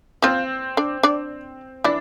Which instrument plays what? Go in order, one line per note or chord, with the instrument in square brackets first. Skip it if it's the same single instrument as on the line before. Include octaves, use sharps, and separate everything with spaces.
[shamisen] F3 F4 [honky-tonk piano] C4
[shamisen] D4 D5
D4 D5
[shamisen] E3 E4 [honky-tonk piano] D4